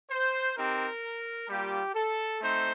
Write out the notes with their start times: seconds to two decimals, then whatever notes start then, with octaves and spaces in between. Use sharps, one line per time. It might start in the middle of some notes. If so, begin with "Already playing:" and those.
0.10 C5
0.56 C4 D#4 G4 A#4
1.49 G3 A#3 F4 G4
1.95 A4
2.41 A3 C4 D#4 C5